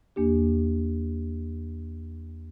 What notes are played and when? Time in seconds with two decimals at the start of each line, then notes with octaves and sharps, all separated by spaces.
0.16 E2 A#3 D4 G4